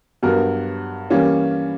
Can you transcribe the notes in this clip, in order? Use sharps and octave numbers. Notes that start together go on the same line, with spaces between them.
G2 F#3 B3 F#4 A#4
E3 G3 A#3 C#4 G4